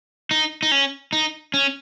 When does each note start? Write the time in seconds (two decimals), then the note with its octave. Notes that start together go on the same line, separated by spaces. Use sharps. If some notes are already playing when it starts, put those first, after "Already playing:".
0.31 D#4
0.63 D#4
0.72 C#4
1.13 D#4
1.54 C#4